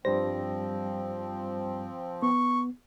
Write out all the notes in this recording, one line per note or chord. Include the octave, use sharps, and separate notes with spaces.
G2 F3 G3 C4 C5 A#6
B3 C#6